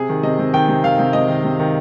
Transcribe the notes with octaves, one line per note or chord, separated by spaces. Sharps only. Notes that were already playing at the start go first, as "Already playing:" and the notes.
Already playing: C3 G#4
D#3
C3 D#5
C3
D#3 G5
C3
D#3 F5
C3
C3 D#5
D#3
C3
D#3